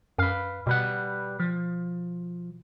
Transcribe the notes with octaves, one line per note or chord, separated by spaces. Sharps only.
F#2 B4 F5
B2 G3 B4 F#5
F3